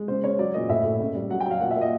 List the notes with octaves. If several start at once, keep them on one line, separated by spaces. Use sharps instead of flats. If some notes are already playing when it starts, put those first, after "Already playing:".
Already playing: G#3
C#3 C5
C#3 C#5
F#3 D5
A#2 D#5
A2 E5
A2
C#3
G3
F#3 F#5
G5
F#3 F5
A#2 F#5
E5
A#2
D#5